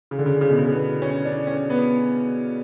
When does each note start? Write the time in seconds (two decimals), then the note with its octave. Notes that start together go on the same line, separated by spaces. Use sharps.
0.11 C#3
0.19 D3
0.26 C#3
0.41 C#3
0.50 B2
0.58 C#3
0.72 B3
1.02 C#4
1.25 D4
1.47 C#4
1.70 B3